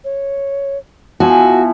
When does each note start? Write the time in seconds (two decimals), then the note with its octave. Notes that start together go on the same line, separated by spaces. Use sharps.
0.04 C#5
1.20 F3 B3 E4 F#4 G#5